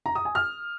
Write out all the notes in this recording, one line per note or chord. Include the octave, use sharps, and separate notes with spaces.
A#5
D#6
G#5
F6